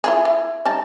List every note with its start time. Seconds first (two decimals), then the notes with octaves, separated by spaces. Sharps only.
0.04 E4 F4 G#4
0.25 E4
0.65 G3 D#4 A5